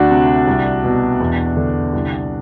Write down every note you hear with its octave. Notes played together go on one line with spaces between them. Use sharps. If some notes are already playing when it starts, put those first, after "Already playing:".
Already playing: D2 D4 F#4
C3
C2
B2
E2
D3
C2